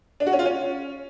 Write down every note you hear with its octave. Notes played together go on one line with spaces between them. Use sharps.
D4
F#4
C#4
F4
C#4